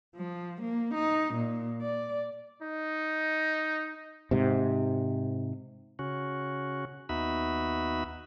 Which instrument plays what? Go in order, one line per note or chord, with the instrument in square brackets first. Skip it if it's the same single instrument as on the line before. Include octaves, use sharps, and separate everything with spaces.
[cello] F3
A#3
D#4
A#2
D5
[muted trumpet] D#4
[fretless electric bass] G#2 C3
[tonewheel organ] C#3 C#4 F#4
D#2 B3 D#4 F#4 E5 B5